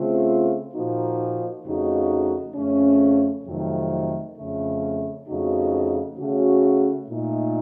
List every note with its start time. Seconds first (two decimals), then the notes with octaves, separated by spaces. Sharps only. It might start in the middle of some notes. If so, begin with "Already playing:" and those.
Already playing: C#3 A3 C4 F4
0.74 A#2 F3 A#3 D#4 F#4
1.65 F2 C#3 A3 D#4 F#4
2.55 F2 C#3 A3 C#4
3.45 F2 C3 D#3 F#3 A3
4.36 F2 C#3 A3
5.27 F2 C#3 A3 D#4 F#4
6.17 C#3 A3 C#4 F#4
7.08 A#2 A3 D#4